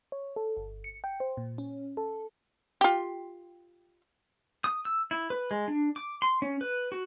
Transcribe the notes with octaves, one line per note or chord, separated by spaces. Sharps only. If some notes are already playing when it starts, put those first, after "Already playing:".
C#5
A4
G1
C#7
G5
C5
A#2
C#4
A4
F4 G4
D#6
E6
E4
B4
G#3
D4
D6
C6
C#4
B4
F#4